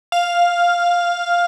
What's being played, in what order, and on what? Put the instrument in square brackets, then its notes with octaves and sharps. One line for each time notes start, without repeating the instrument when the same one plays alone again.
[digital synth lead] F5